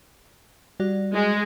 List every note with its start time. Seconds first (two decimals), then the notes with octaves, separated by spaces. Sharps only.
0.80 G3 F#4 D5
1.14 G#3